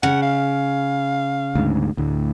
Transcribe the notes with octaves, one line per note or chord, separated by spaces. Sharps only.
C#3 F#5
F5
D2 G#2
D2 A2